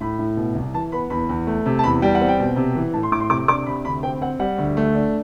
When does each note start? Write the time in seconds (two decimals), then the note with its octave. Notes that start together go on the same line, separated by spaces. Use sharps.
0.01 A2 B5
0.19 A2
0.37 B2
0.55 C2
0.74 E3 A5
0.92 B3 B5
1.10 E2 B5
1.29 E2
1.47 A3
1.66 C3
1.79 A5
1.83 E2 B5
2.02 G3 G5
2.15 F#5
2.21 C4
2.28 G5
2.39 B2
2.56 C3
2.75 E3
2.93 A2 A5
3.03 C6
3.12 A2 D6
3.20 C6
3.30 C3 D6
3.48 D4 D6
3.66 C3 B5
3.85 D2 B5
4.03 C4 G5
4.22 C4 F#5
4.39 G3 F#5
4.58 D2
4.77 A3
4.94 D4